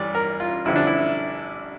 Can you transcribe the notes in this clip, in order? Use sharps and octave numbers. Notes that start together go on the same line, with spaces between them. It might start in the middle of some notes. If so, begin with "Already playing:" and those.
Already playing: A1 G2 E3 D5
A#4
F4
A1 G2 D3 F3 E4
D4
E4